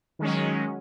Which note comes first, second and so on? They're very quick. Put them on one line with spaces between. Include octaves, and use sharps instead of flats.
D#3 G#3 C#4 F#3